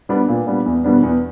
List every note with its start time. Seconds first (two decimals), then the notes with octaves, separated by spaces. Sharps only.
0.09 G3 B3 D4
0.28 A#2
0.47 G3 B3 D4
0.66 E2
0.84 B2 G3 B3 D4
1.03 E2